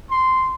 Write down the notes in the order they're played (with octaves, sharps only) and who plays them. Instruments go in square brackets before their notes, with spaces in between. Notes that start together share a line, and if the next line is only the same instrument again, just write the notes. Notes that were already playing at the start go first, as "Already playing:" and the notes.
[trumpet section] C6